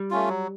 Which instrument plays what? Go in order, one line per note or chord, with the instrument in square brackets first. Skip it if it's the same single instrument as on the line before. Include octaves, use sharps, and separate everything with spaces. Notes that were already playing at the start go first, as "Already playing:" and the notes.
Already playing: [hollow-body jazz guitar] G3
[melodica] A3 C#4 F4
F#3